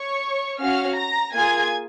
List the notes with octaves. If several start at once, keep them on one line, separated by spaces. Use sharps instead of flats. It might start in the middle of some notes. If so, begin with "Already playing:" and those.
Already playing: C#5 C#6
C#4 F#4 F5 F6
A#5 A#6
A#3 F4 G#4 G#5 G#6